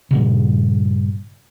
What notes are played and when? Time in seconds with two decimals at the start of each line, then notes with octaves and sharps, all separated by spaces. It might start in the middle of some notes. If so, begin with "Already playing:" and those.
0.11 G2 A#2 C#3